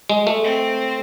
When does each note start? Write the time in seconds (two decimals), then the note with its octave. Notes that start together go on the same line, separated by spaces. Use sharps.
0.10 G#3
0.27 A3
0.44 C4